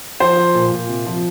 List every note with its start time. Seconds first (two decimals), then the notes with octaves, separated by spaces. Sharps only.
0.20 F3 C5
0.37 F3
0.55 A#2
0.72 A#2
0.89 C3
1.07 F3